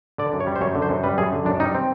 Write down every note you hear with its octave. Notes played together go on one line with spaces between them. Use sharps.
D3 D5
F#2
C#5
G3
C5
F#2 C#5
D3
C5
F#2
G3 B4
F#2 G#4
D3
F#2 D4
G3 D#4
C4